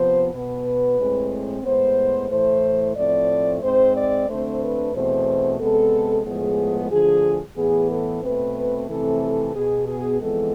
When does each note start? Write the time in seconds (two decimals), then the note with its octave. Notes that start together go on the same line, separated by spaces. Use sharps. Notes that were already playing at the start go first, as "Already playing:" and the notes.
Already playing: C3 F3 B3 C5
0.33 B2 B3 B4
0.98 A2 G#3 C4
1.64 A2 G#3 B3 C5
2.30 A2 E3 A3 C5
2.96 A2 F3 A3 C4 D5
3.61 G#2 G#3 C4 C5
3.95 D5
4.28 D2 D3 A3 C4 C5
4.61 B4
4.93 E2 B2 A3 C4 C5
5.59 C3 G#3 B3 A4
6.25 A2 F3 G#3 B3 G#4
6.90 D2 D3 F3 G#4
7.57 A2 E3 B3 G#4
7.89 A4
8.22 B2 A3 C4 B4
8.88 F2 C3 E3 A3 C4 A4
9.54 B2 B3 G#4
9.87 G#4
10.20 F2 E3 G#3 B3 A4